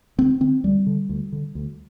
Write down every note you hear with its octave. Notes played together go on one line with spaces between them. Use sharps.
D2 C4
D3 C4
D2 G3
D3
D2
D3
D2